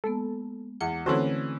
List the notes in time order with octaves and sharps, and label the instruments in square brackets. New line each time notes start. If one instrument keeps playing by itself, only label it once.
[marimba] G#3 A#3 B3 [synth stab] A4
[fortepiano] E2 [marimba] F#5 [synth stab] C#7
[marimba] D3 A3 C4 [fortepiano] E3 C#4 C5 [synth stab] F#4 A4